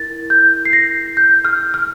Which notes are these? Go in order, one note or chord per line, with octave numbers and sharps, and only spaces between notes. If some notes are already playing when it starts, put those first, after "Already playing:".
Already playing: E4 A#4 A6
G6
C7
A#6
G6
F6
F6